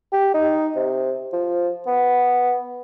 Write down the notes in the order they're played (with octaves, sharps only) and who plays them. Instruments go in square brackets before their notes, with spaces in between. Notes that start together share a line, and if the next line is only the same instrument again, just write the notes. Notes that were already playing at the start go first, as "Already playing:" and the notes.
[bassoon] G4
D#4
C3
F3
B3